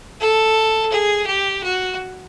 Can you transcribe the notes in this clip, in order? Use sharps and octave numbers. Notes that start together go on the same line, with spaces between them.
A4
G#4
G4
F#4